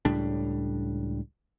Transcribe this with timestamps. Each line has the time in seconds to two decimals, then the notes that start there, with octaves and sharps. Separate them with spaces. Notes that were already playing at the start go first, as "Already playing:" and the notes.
0.05 C#2 A2 G3 D4